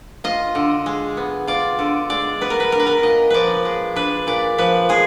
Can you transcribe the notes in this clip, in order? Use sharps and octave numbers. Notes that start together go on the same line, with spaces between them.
F4 D#5
D3
G#3
B3
F4 D5
D3
G#3 D5
B3 B4
A#4
B4
D4 A#4
B4
A#4
A#2 D#5
F3 B4 D5
G#3
D4 B4
A#2 D5
F3 B4
G#3 G#4